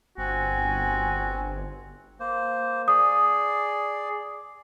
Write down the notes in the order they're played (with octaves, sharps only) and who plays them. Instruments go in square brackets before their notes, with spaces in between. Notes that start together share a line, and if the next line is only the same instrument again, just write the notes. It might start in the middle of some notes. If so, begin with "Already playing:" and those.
[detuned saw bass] G1 [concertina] C4 [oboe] F#4 [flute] G#5
[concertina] A#3 C5
[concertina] G#4 D5 [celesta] D#6